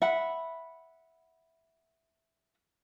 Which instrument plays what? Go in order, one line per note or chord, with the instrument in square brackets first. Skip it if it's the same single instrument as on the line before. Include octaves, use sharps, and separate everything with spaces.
[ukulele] E5 F#5 B5